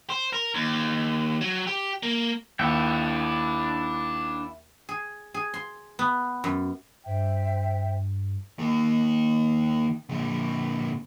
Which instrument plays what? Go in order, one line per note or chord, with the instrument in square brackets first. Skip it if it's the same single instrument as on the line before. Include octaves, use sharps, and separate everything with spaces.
[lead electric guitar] C5
A#4
D#2
F#3
G4
A#3
[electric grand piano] D#2 [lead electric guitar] D4 E5 [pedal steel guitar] E4 F#5 G5
[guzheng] G#4
G#4
C6
B3
F#2
[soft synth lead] G2 [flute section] C5 E5 G5
[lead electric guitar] D#3 A#3
A#2 D3